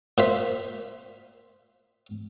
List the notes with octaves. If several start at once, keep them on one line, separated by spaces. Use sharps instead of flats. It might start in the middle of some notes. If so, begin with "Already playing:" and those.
A#2 C5 E5